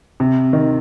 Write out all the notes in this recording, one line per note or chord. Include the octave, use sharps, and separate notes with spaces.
C3
D#3